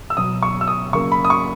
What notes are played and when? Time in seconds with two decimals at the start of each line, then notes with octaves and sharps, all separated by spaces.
0.10 E6
0.17 B2 F#3 B3 D#6
0.43 C#6
0.61 E6
0.67 D#6
0.93 C#3 F#3 A#3 C#6
1.12 B5
1.25 D#6
1.30 C#6